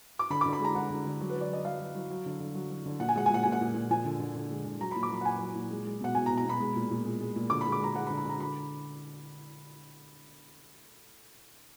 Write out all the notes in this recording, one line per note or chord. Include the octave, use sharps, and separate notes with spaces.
D6
D3 B5
D6
D3
B5
G#3 A#5
D3 F#5
D3
D3
F#3
B4
F#3
D5
F#3 D#5
F#3 F5
F#3
F#3
F#3
D3
D3
F#3
F#3
D3
A#2 F#5
G#5
G#3 F#5
G#5
A#2 F#5
A#2 G#5
F#5
A#2
A#2
F3 G#5
D3
D3
D3
G#3
D3
F#3 A#5
B5
A#2
D6
F#3 B5
F#5
A#2 G#5
F#3
A#2
G#3
G#3
B2 F#5
B2 G#5
A#5
B2
A#5
B2 B5
G#3
A#2
A#2
G#3
G#3
A#2
D3 D6
B5
G#3
D6
G#3 A#5
G#3 F#5
B5
D3
B5
D3 A#5
D3 B5